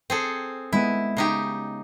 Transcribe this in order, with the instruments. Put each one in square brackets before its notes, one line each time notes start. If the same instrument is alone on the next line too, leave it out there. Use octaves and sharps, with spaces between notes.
[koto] C4 G#4 A4
[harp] G#3 B3 D#7 [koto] E4
[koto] C#3 D#4 G4